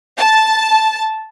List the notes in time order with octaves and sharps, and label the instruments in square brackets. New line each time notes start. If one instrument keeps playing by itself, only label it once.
[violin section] A5